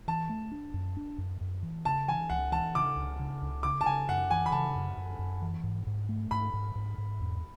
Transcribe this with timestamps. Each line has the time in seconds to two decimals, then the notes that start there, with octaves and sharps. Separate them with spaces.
0.08 E3 A5
0.29 A3
0.52 D4
0.74 F#2
0.97 D4
1.18 F#2
1.41 F#2
1.63 E3
1.85 C#3 A5
2.08 E3 G#5
2.30 C#2 F#5
2.52 E3 A5
2.75 C#3 D6
2.97 C#2
3.19 C#3
3.42 C#2
3.63 C#3 D6
3.81 A5
3.86 C#3 G#5
4.09 F#2 F#5
4.30 E3 G#5
4.46 B5
4.52 C#3 A5
4.75 F#2
4.97 F#2
5.19 F#2
5.42 E3
5.63 G#2
5.87 G#2
6.09 A3
6.31 G#2 B5
6.53 G#2
6.75 G#2
6.98 G#2
7.20 E2